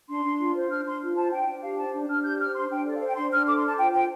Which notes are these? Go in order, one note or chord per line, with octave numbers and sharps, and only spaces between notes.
D4 C6
D4
F4
C5
D4 F6
D4 C6
F4
C5 A5
D4 G5
D4
G4 F5
C5 A5
D4
D4 F6
G4 G6
C5 F6
D4 C6
D4 G5
A4 D5
F5
C5
G5
D4 C6
D4 F6
A4 D6
C6
C5
A5
F4 G5
C5 G5